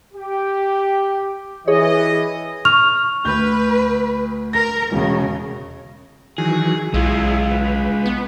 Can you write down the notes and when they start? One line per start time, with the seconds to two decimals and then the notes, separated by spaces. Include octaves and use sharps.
0.13 G4
1.68 E3 G#4 C#5 D#5
2.65 C#6 F6 F7
3.25 D2 B4 G6
4.53 A#4 A#6
4.92 E1 C#3
6.38 D#3 E3 F#3 G#4
6.94 B1 G#3 E4 F4 G#4
7.51 B4
8.06 B3